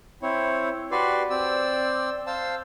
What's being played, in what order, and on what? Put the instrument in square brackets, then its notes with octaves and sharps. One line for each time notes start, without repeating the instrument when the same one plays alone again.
[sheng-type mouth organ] C4 E4 C#5
F#4 G4 B4 D5 C6
C4 D5 E6
C5 F5 A5 E6